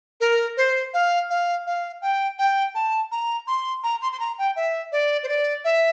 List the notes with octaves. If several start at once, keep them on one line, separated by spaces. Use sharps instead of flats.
A#4
C5
F5
F5
F5
G5
G5
A5
A#5
C6
A#5
C6
C6
A#5
G5
E5
D5
C5
D5
E5